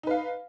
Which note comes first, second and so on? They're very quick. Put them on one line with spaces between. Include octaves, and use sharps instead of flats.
D#4 B4 F5